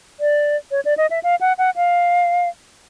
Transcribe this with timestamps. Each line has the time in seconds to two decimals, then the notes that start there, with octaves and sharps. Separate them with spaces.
0.20 D5
0.71 C#5
0.85 D5
0.97 D#5
1.10 E5
1.23 F5
1.41 F#5
1.58 F#5
1.76 F5